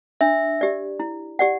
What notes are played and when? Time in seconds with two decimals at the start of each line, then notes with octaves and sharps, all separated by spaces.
0.21 D4 E5
0.61 G4 D5
1.00 E4
1.39 G4 D5 F#5